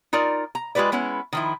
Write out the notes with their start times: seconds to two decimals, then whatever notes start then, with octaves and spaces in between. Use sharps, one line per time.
0.13 D#4 F4 A#4 D5
0.55 A#5
0.75 G#3 F4 G4 B4 D5
0.92 G#3 B3 C#4 E4
1.33 D#3 F3 E4